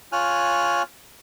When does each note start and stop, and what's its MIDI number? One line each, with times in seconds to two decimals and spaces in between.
0.12 0.82 65
0.12 0.82 73
0.12 0.82 80
0.12 0.82 89
0.12 0.82 90